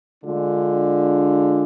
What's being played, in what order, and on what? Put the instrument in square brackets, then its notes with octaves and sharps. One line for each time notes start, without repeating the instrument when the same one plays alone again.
[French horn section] D3 G#3 D4 F4